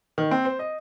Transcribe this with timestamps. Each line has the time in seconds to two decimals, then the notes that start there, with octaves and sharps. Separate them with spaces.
0.18 D#3
0.31 C4
0.45 C5
0.59 D#5